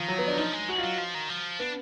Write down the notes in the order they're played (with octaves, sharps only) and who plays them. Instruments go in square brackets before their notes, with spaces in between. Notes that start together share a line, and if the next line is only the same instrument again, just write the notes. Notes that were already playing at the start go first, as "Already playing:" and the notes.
Already playing: [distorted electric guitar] D#3 [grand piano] F3
[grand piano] F#3
B3
D4
[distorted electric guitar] F3 [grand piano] D#4
[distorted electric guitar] G#3
[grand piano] F#4
F4
[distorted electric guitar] F#3
F3
D#3
F3
[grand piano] B3 [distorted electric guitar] D4